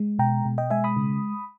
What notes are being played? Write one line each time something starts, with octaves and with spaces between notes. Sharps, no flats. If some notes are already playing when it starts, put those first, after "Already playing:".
Already playing: G#3
B2 G5 A#5
B2
D#5 G5
G#3 E5 G#5
B5 D#6
C#3